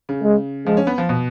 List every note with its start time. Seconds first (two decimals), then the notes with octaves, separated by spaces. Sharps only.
0.09 C#3
0.22 G#3
0.66 F3 G#3
0.77 C#4
0.87 B3
0.98 F3
1.09 B2